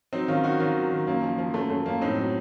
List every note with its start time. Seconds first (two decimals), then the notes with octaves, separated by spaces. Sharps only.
0.13 F#3 C4 D#4
0.28 D#3 C#4 F4
0.44 D#3 D#4 F#4
0.60 D#3 C#4 F4
0.75 F#3
0.92 D#3
1.07 F#2 A#3
1.23 F3
1.38 F3
1.54 F#2 A3
1.70 F#2 A3
1.86 F#2 A#3
2.02 A2 C4 D#4
2.17 F#3